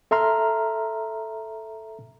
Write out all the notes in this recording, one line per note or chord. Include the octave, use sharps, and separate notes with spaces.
A4 E5 A#5 C6 F6